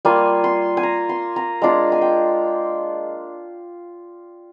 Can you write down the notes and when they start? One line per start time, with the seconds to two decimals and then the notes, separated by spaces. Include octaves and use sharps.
0.05 G3 A#3 F4 G#5
0.44 C6
0.77 G#5
0.83 A#5
1.09 C6
1.36 A#5
1.62 G#3 D4 F4 F5
1.92 G#5
2.02 G5